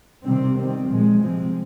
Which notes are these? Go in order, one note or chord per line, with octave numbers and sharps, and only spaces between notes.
C3 D#3 G3 C4
D#3 G3 C4
A#2 F3 G#3
C3 F3 G#3 C4